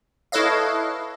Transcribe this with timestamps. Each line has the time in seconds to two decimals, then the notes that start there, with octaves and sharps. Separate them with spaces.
0.32 E4 A4 B4 C#5 D#5 F5